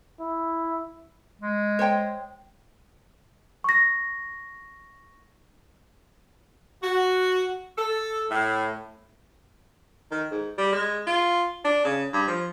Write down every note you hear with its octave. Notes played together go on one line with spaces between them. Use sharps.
E4
G#3
C5 C#5 G5
C#6 A#6
F#4
A4
A2
D#3
G#2
G3
G#3
F4
D4
C#3
G2
F3